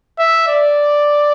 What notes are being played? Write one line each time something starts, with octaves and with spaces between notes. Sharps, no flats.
E5
D5